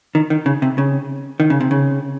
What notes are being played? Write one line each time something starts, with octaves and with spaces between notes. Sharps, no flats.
D#3
D#3
C#3
C3
C#3
D#3
C#3
C3
C#3